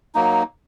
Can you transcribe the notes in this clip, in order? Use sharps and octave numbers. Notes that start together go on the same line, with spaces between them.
F#3 A#3 D#4